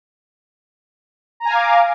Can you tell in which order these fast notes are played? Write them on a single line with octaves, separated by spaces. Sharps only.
A#5 G#5 F5 D6